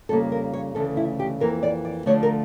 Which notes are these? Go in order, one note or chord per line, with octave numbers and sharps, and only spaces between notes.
F2 C#3 G3 A#3 A4
A#4
C#5
D2 C#3 E3 A3 A4
E4
G4
F2 E3 A#3 A#4
D5
D5
D2 D3 F3 A3 C#5
A#4